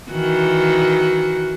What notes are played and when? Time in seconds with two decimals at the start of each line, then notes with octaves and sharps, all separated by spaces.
0.11 D#3 E3 F#4